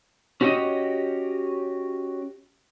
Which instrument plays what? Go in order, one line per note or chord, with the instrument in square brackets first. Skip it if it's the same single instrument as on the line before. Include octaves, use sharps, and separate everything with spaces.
[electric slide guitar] C#4 F#4 G4 C#5 D#5